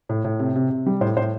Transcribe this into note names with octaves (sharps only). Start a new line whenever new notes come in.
A2
A2
C3
C3
C3
G3
A2 C5
A2 C5